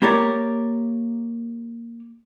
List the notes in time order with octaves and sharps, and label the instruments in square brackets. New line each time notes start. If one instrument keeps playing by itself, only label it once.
[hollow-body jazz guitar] A#3 G4 A#4 C#5 D5